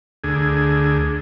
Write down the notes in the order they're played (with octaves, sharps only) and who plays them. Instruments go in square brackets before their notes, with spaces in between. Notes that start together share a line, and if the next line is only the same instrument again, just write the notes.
[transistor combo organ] D2 G#4